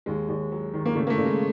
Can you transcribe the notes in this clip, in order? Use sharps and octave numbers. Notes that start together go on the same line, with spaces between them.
D#2 G#3
D#2
F#3
D#3
A#3
C#3 A3
A#3
A3
C#3
G#3